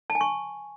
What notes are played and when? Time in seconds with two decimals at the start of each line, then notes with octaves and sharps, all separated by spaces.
0.10 A5
0.15 G#5
0.21 C#6